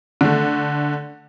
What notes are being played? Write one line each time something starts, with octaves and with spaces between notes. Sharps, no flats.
D3 A3